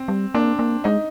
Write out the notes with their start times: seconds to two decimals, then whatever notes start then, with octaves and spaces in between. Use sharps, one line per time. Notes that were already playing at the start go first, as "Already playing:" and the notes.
Already playing: C4
0.08 G3
0.34 A#3 D4
0.59 A#3
0.84 G#3 D#4